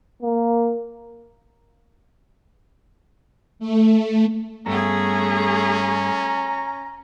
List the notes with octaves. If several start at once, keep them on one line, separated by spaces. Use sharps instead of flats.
A#3
A3
G2 A3 B3 C#4 G#4 A#5